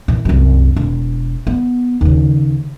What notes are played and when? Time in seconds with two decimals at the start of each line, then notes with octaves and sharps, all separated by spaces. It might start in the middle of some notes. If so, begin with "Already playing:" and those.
0.08 A#2 E3
0.25 C2 F#2
0.76 E1
1.47 B3
2.01 D#2 C#3